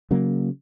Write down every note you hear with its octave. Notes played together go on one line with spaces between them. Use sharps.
C#3 F#3 A#3